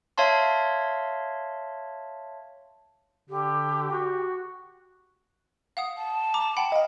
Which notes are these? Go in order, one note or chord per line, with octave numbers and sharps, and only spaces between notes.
C#5 E5 F5 A5 C6
D3 G4
F#4
F5 F#5 D#6
A5
A#5 D6
F#5 G5 B5
D#5 F5